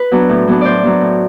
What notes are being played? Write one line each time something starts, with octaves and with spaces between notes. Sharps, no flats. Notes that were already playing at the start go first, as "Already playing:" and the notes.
Already playing: B4
F#3 B3 D4
A2
F#3 B3 D4
A2 C5 D5
F#3 B3 D4
A2